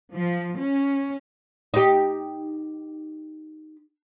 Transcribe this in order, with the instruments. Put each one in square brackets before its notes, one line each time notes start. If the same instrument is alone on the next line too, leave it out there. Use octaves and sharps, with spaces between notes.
[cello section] F3
C#4
[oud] D#4 G4